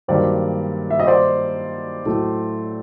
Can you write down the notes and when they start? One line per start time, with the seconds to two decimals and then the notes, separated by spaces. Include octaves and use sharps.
0.08 G2 D#3 F#3 A#3 C5 D5
0.90 E5
0.99 D#5
1.07 C5 D5
2.06 A2 F#3 A3